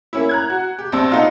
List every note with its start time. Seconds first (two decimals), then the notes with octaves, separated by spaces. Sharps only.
0.13 A#3 C#4 E4
0.29 A#5 F#6 G#6
0.50 F#4
0.79 G4
0.92 A#1 C4 A5 E6
1.12 B3 D#4 F4